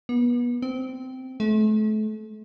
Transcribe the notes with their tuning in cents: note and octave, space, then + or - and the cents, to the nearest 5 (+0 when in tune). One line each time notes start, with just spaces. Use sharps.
B3 -30
C4 -15
A3 -35